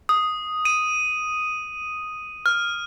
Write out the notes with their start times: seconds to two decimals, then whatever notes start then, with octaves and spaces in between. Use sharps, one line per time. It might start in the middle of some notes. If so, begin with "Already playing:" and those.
0.09 D#6
0.65 D#7
2.46 F6